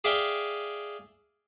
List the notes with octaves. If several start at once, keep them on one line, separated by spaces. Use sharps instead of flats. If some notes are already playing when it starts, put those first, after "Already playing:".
G#4 D5 E5 F5 G5 G#5